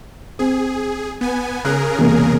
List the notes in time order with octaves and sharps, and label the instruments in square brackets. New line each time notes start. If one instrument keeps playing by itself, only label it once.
[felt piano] C4 [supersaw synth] G#4
[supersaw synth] B3 G#5
[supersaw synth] C#3 G#4 A#4 [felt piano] F#6
[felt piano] E1 C3 A#3